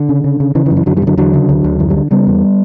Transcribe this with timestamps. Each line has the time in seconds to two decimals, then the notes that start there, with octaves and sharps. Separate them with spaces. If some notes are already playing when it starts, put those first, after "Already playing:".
Already playing: D3
0.09 C#3
0.24 C#3
0.40 C#3
0.55 C#3 E3
0.66 E3
0.71 F#2
0.77 E3
0.86 F#2 D3 F#3
0.97 E3 G3
1.02 C#3
1.07 D3 F#3
1.18 E2 D3 F#3
1.34 C#3
1.49 D2
1.64 D2
1.79 F#2 E3
1.90 E3 G3
1.96 D3
2.11 C#3 G3 B3
2.27 E2